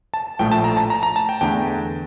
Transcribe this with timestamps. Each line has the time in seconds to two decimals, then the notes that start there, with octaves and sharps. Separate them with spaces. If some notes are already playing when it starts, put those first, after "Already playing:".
0.14 A5
0.39 A#1 A2 F3 A3 G5
0.52 A5
0.64 A#5
0.77 A5
0.90 A#5
1.03 A#5
1.16 A5
1.29 G5
1.41 E2 D3 A3 G5